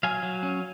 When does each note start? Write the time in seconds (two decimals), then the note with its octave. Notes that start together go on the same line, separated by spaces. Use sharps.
0.03 F#3 F5 G#5
0.23 F#3
0.43 C#4